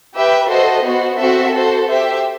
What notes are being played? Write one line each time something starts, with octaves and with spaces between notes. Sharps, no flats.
G4 B4 E5 G5
F#4 A4 C5 D#5
B3 F#4 C5
C4 F#4 A4 C5 E5
F#4 A4 C5
G4 C5 E5